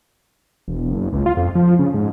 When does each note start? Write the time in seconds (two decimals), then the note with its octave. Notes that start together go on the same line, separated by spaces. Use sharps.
0.68 E1
0.91 F#1
1.13 C#2
1.26 F4
1.37 F2
1.55 F3
1.67 F3
1.79 C#3
1.94 G#2